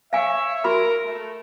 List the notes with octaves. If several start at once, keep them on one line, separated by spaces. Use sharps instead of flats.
C#5 E5 F5 G#5
F#4 A#4 B5
A3